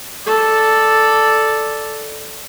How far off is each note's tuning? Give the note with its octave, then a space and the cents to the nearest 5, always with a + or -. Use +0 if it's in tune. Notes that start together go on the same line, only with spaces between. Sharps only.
A4 +0 D5 +0